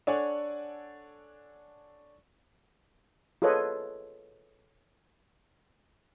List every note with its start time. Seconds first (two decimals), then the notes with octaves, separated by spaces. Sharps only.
0.07 D4 A4 C#5 D5 F#5 G#5
3.42 F4 G#4 A4 B4 C#5 D#5